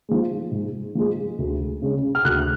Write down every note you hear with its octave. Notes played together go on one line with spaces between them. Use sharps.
F3 G#3
G#2
F3 G#3
D2
C#3 G#3 C#4
F6
D2 F#6